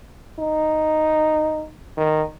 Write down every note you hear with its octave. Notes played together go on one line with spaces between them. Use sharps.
D#4
D#3